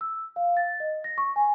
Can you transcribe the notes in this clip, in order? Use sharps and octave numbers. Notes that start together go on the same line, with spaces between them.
E6
F5
A6
D#5
A#6
C#6
G#5